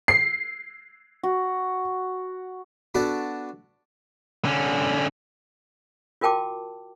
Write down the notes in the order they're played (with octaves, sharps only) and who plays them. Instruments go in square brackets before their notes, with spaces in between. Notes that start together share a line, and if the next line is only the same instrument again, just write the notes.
[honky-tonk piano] C7
[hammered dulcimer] F#4
[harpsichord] B3 D4 F#4 A4 D5
[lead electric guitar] D3 C#4
[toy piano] F4 F#4 A#4 G5 A5 D6